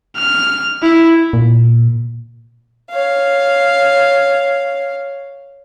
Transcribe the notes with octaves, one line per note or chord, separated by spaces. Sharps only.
F6
E4
A#2
C#5 F5